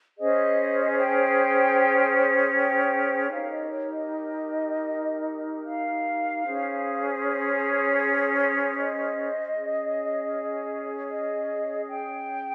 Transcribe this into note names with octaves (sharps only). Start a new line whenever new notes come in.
C#4 G#4 C5 D#5
G5
G5
D#4 G4 A#4 C#5 F5
D#5
C#5
D#5
F5
C#4 G#4 C5
C#5
D#5
C#4 G#4 C#5
D#5
G5